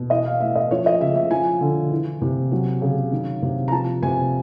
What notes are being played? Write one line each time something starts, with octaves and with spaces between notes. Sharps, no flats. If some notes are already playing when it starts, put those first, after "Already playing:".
Already playing: B2
E3 D#5
F5
A2 E5
D#5
F3 C#5
D#5
C#3 E5
E5
F3 G#5
D3
E3
C3
F#3
C#3
D#3
C3
A#5
F3 A5
C3 G#5